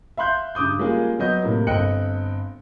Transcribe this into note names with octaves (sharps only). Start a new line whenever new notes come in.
E5 F5 C6 F#6 G6
G2 C#3 D6 D#6 G6
G3 G#3 A#3 C#4 F4 G#4
F#3 B3 D#5 G6
A2 C3 A#3
G1 C4 D#5 G5 F#6 C#7